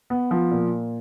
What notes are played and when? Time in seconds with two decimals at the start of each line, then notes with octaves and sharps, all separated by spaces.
0.10 B3
0.31 F3
0.51 A#2